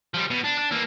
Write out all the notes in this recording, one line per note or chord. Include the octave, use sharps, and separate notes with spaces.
F3 G3
B2
D4
D4
E3 A#3